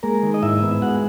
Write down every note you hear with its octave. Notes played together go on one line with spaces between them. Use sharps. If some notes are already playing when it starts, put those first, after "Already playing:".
G#3 A#3 A#4
D#3
D#5
G#2 E4 E5
B3
G#3 F#4 F#5